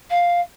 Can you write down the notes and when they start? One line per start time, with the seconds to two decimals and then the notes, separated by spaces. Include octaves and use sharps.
0.10 F5